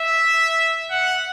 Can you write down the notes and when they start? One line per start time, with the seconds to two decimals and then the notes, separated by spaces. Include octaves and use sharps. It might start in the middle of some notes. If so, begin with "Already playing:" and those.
Already playing: E5
0.91 F#5